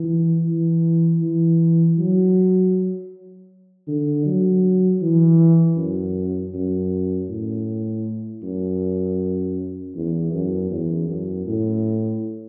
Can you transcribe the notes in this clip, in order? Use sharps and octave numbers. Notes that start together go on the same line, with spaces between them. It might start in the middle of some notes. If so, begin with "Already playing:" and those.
Already playing: E3
E3
E3
F#3
D3
F#3
E3
F#2
F#2
A2
F#2
E2
F#2
E2
F#2
A2